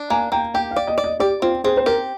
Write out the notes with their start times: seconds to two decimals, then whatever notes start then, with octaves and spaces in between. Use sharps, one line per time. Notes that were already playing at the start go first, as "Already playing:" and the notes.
Already playing: D4
0.10 A#3 G#5
0.32 A#3 G5
0.54 G4 G5
0.71 F5
0.76 D5
0.87 D#5
0.98 D5
1.04 D#5
1.20 G4 D5
1.42 C4 F4
1.64 C4 G#4
1.77 C5
1.86 G4 A#4